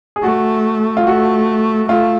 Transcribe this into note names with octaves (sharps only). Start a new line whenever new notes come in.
G#4
A3 F#4
F4
A3 F#4
A3 F4